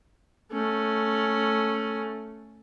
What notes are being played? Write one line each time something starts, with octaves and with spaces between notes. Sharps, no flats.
A3 C#4